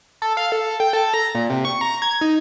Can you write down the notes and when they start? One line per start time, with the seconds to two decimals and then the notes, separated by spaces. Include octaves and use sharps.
0.22 A4
0.37 F5
0.52 A4
0.80 G5
0.93 A4
1.14 A#5
1.35 A#2
1.50 C3
1.65 C#6
1.81 A#5
2.02 G#6
2.21 D#4